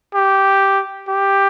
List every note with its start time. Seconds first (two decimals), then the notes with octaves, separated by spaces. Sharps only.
0.15 G4
1.08 G4